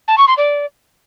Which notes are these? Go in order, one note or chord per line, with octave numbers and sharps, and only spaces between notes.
A5
C#6
C6
D5